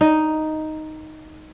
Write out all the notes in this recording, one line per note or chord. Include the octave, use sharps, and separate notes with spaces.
D#4